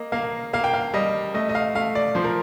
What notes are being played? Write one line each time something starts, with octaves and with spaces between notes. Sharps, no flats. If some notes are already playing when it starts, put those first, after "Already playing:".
Already playing: A#3 D#5
A#3 F5
A#3 F5
G5
F5
G3 D#5
A3 D#5
D#5
F5
A3 F5
D5
F3 C5
A#4